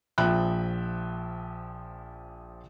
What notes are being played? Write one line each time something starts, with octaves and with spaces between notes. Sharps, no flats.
A#1 F3 E5 G5 B5 F#6